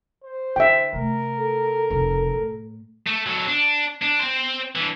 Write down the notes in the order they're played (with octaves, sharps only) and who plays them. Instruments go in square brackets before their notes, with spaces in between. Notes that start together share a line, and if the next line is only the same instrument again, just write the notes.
[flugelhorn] C5
[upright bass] D3 [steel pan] E5 G5
[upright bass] C3 A3 [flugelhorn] A#4
[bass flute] A4
[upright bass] F1 C#3
A2
[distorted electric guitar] A3
F#3 A4
D4
D4
C4 C5
E3 D4